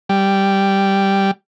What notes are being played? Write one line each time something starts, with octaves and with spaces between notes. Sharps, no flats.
G3